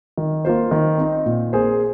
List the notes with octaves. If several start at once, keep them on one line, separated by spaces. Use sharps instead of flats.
D#3
A#3 F4 C5
D#3
C4 D#4
A#2
A#3 G#4 C5